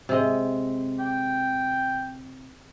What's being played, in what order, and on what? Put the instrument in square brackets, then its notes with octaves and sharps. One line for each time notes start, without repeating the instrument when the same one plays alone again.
[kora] C3 G#3 D#5
[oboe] G5